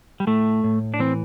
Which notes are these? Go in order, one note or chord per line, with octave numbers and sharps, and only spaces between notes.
G3
A2 A3
A2
D4
E3 C4